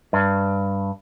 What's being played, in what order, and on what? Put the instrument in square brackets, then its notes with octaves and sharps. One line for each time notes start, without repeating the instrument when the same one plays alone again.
[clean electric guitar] G2